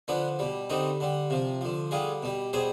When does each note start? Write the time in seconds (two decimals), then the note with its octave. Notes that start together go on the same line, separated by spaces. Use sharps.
0.08 D3 F3 B3 D4
0.39 B2 G3
0.70 D3 G3 C4 D#4
1.00 D3 G3
1.30 C3 F3
1.61 D3 F3
1.91 D3 G3 F4 G#4
2.23 B2 G3
2.53 B2 G3 G#4 C5